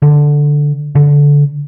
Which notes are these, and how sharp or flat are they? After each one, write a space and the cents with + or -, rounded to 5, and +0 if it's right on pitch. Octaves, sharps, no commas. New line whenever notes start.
D3 +0
D3 -20